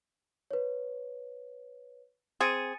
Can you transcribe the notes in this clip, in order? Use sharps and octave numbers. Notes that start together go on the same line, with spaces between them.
B4 C#5
C4 G#4 A6 C#7 D#7